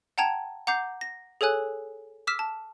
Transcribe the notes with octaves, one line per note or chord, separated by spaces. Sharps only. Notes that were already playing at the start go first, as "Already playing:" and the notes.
F#5 G5 A5 A#5 G#6 E7
F#5 A#5 D6 G6 C7
A#6
G#4 A4 C#5 G#5 F#6
D6 E6 F6 B6 E7
A5